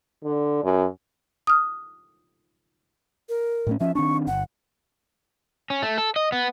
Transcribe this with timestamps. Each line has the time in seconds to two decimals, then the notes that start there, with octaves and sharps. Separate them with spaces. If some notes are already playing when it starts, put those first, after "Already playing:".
0.24 D3
0.64 F#2
1.47 D#6 F6
3.29 A#4
3.67 A2 A3 C#4
3.80 F3 C#4 E5
3.95 D#3 C4 D4 C#6
4.27 G1 F#5
5.70 C#4
5.82 A3
5.98 A4
6.16 D#5
6.32 B3